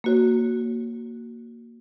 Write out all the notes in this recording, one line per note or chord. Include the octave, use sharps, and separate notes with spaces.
A#3 F#4 C#5